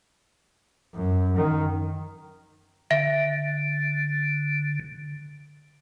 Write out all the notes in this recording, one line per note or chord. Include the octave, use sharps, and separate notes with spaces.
F#2
D#3
D3 E5